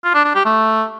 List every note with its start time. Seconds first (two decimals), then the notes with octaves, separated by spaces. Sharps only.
0.04 F4
0.14 D4
0.25 D4
0.35 G4
0.45 A3